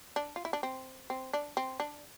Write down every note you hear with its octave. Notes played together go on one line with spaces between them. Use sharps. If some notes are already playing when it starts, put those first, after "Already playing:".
D4
F4
E4
D4
C4
C4
D4
C4
D4